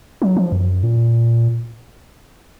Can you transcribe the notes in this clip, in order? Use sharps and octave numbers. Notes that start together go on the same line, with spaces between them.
F#3
F3
F#2
A#2